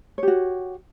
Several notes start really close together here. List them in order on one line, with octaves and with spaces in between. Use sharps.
C#5 G4 F#4